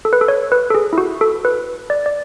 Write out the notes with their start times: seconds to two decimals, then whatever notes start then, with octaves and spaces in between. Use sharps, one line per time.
0.05 A4
0.13 B4
0.21 A4
0.28 C#5
0.52 B4
0.70 A4
0.75 G#4
0.93 E4
0.98 F#4
1.21 A4
1.45 B4
1.90 D5
2.06 D5